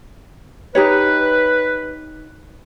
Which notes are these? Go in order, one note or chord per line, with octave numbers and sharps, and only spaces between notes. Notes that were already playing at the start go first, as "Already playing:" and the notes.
D#4 G4 B4 C#5